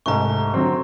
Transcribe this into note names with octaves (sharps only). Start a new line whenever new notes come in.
C2 G#2 A3 A#5 C#6
D3 F#3 C4